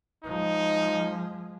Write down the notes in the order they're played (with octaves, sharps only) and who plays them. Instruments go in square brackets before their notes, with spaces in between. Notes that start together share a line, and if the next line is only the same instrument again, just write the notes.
[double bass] F3 G#3 [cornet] D#4